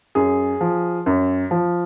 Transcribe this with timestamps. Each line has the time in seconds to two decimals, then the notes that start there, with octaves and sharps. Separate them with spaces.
0.15 F#2 G#4
0.61 F3
1.06 F#2
1.51 F3